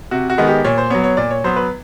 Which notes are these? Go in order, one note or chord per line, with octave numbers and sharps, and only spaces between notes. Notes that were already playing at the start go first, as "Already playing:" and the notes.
C3 F#4
F#4
D#3 G#3 B3
G4
A#2 C#5
C5
F#3 B3 C#5
C#5
A#2 D5
C#5
F#3 B3 C5
B4